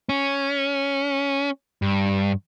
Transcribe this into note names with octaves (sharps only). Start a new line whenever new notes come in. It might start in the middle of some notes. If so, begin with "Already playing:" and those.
C#4
G2